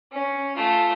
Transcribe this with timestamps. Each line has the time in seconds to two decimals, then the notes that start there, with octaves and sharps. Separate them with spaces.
0.12 C#4
0.56 A3 F4